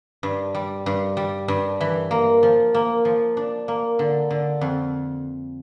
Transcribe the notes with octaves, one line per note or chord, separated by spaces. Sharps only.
G2
G3
G2
G3
G2
E3
A#3
F3
A#3
F3
D4
A#3
D3
D3
F2